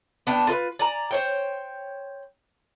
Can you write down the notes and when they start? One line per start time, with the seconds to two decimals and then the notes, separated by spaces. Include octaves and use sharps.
0.27 B3 D4 G5
0.47 F4 A#4 B4
0.79 D5 G#5 A#5
1.11 C5 C#5 G5